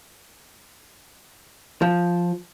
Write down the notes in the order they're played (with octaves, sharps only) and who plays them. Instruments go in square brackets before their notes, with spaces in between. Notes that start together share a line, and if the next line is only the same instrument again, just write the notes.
[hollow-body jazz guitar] F3